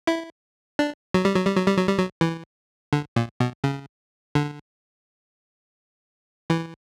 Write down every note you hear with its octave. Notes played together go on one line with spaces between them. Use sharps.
E4
D4
F#3
G3
F#3
G3
F#3
G3
F#3
G3
F#3
E3
D3
A#2
B2
C#3
D3
E3